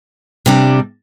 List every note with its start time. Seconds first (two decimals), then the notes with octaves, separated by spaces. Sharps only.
0.46 C3 G3 D4